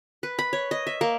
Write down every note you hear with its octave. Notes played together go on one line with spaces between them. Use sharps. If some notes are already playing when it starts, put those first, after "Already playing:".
B4
B5
C#5
D#5
E5
A#3